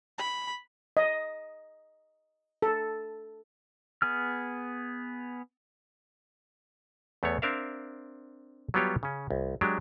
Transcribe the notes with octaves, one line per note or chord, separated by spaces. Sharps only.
B5
D#5
A4
B3 G#4 F6
E2 A3 B3 C#5
C4 D4 A#4 E5 F5
F#3 G3 B3 F4 G4 C#5
C#3 C#4
C2
F#3 G#3 D4 G4